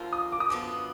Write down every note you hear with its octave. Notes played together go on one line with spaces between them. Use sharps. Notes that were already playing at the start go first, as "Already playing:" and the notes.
Already playing: D#2 D3 F3 A#3 F4
D#6
D6
D#6
F#2 D3 F3 B3 D6